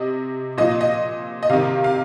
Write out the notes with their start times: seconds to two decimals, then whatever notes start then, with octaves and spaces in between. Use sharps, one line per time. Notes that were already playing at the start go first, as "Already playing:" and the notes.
Already playing: C3 D#5
0.58 A#2 F3 D#5
0.81 D#5
1.43 D#5
1.50 C3 D#3 F5
1.84 F5